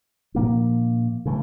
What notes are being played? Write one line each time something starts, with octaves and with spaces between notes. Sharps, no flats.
A#2 F3 A#3 D4
C#3 E3 A3